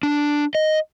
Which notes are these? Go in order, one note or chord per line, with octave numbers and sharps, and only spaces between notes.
D4
D#5